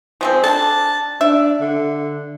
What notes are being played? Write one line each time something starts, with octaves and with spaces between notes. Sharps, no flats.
F3 G#3 C4
D4 A5
D4 E5
D3